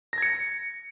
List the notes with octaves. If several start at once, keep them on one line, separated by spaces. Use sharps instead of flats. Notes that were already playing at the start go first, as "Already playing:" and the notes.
G#6 A#6 C#7